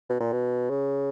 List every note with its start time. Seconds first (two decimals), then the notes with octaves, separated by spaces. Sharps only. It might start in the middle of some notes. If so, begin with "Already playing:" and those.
0.09 B2
0.20 A#2
0.32 B2
0.70 C#3